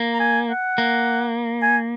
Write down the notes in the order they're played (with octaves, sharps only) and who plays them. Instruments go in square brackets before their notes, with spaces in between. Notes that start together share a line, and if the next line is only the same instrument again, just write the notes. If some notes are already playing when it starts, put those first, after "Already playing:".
Already playing: [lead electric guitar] A#3
[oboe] A#5
G#5
F#5
[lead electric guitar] A#3
[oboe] G#5